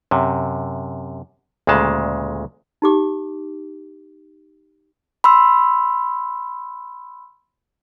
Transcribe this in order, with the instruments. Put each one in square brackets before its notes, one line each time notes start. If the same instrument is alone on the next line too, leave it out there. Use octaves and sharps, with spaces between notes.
[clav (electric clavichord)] F#2 C3
D2 A#2 C#3 G#3 A5
[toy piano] D#4 G4 D6
[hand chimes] B5 C6 E6